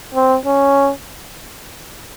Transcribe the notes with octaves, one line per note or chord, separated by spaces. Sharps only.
C4
C#4